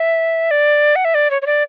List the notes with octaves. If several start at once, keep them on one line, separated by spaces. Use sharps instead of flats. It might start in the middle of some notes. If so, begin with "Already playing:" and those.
Already playing: E5
D5
F#5
E5
D5
C#5
C#5
D5